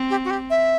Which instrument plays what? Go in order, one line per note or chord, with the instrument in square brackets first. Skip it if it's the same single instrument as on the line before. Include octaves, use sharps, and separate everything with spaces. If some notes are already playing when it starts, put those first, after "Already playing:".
Already playing: [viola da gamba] C4
[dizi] G4
F#4
G4
E5